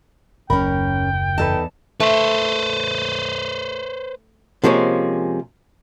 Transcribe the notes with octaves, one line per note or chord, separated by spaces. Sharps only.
F#1 D#2 C#4 A#4 G5 B5
E2 D#4 A4 B4 A5
A3 B4 C5
C3 F3 G#3 A#3 C#4